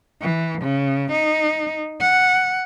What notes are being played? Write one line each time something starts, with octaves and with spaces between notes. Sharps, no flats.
E3
C#3
D#4
F#5